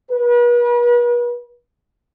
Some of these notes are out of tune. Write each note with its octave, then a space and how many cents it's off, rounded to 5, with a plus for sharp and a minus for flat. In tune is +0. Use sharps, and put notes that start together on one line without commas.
B4 -40